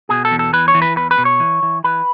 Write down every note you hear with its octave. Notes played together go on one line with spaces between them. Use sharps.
B2 G#4
A4
E2
A4
E3 B4
C#5
E3
B4
E2 B4
B4
B2
C#5
E3
E3
E3 B4